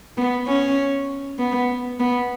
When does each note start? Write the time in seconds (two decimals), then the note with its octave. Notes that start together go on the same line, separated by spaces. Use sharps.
0.17 B3
0.47 C#4
1.39 B3
2.00 B3